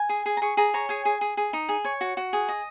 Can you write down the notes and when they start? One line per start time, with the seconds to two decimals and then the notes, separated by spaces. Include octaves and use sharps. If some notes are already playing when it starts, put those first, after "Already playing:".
Already playing: G#5
0.09 G#4
0.26 G#4
0.37 A#5
0.42 G#4 C#6
0.57 G#4 A#5
0.74 C#5 A#5
0.89 G#4 G#5
1.05 G#4
1.21 G#4
1.37 G#4
1.53 D#4
1.69 G#4
1.85 C#5
2.01 F#4
2.17 F#4
2.33 G#4
2.49 D#5